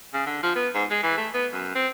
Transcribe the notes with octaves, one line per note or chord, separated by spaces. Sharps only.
C#3
D3
F3
B3
G#2
G#3
E3
A3
B3
F#2
C4